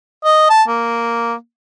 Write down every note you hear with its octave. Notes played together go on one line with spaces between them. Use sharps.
D#5
A5
A#3